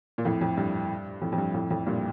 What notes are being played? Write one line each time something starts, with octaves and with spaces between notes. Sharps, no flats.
A#2
F2 A2
F2
G2
F2 A2
F2
G2
F2 A2
F2 A2
G2 A#2